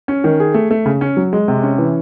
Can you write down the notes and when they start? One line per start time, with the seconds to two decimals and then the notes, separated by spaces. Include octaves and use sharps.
0.08 C#4
0.24 D#3
0.40 G#4
0.54 A3
0.71 A3
0.86 C#3
1.01 C#4
1.17 F#3
1.33 G#3
1.48 C3
1.63 C#4
1.78 E3